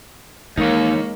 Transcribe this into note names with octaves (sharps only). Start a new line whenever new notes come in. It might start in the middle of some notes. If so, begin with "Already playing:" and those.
D#2 E3 G#3 A#3 D#4 C#5